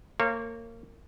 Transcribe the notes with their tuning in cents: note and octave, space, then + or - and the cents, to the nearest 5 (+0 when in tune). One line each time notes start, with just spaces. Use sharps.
A#3 -25 C#5 -25